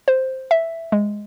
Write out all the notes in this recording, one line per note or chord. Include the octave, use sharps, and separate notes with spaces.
C5
E5
G#3